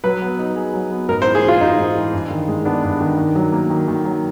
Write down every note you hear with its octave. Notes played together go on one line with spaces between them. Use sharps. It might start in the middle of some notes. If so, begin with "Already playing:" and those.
F#3 B4
B3
D#4
G#4
F#3
B3
G#2 A#4
C5
E3
G#4
G#3
F4
G#2 D#4
G#2
E3
G2
D#3
G#3
B3 D4
G2
D#3
D#3
F#3
A#3
D#3
D#3
F#3